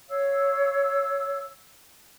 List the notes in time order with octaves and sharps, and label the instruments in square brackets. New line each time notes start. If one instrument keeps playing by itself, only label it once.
[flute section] C#5 F5 E6